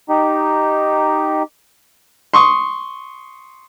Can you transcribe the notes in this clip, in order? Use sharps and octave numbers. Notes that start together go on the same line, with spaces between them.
D#4 G4
C6 C#6 D#6